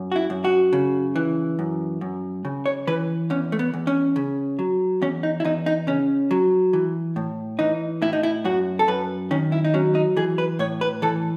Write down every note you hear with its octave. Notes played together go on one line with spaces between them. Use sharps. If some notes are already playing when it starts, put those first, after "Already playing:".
Already playing: F#2
F#4
E4
F#2
F#4
C#3
E3
F#2
F#2
C#3
C#5
E3 B4
E2 C#4
A3
B3
E2
C#4
C#3
F#3
E2 C#4
D#4
E4
E2 D#4
D#4
C#3 C#4
F#3
E3
A2
E3 D#4
A2 E4
D#4
E4
F#2 F#4
A4
F#2 B4
D#3 C#4
E4
D#4
F#3 C#4
D#4
E3 G#4
B4
A2 C#5
B4
E3 A4